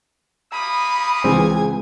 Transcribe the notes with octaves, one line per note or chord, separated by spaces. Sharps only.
A3 A#3 B5 D#6
C#2 E3 C4 G#5